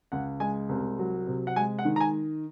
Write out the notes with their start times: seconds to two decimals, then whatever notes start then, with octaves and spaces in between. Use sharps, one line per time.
0.12 C#2 F#5
0.40 G#3 G#5
0.69 C2
0.99 F#3
1.27 C3
1.47 F#5
1.56 G#3 G#5
1.79 F#5
1.85 D#3
1.96 A#5
2.00 G#5